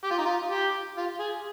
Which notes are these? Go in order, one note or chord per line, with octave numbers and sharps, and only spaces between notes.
G4
F4
D#4
F4
G4
F4
G#4